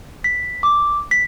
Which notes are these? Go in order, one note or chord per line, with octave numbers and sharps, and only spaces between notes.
B6
D6
B6